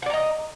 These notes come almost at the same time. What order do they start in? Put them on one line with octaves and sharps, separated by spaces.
F#5 D5 A#5 D#5